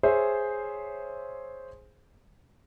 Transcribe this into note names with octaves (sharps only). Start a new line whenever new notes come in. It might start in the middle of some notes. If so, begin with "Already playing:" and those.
G#4 C5 C#5 E5